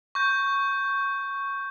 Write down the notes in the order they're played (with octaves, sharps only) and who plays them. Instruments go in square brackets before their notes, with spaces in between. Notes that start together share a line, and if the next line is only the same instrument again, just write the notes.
[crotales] C#6 G6